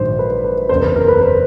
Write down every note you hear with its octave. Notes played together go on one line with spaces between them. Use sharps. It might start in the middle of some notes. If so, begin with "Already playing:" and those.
Already playing: A#1 G#2 D#3 F#3 C5
B4
B4
F#1 E2 C#3 C5
B4
A#4
B4
C5